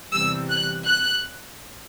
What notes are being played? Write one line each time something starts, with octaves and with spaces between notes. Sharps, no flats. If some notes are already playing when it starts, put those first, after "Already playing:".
E2 C3 E3 G3 E6
F#6
F#6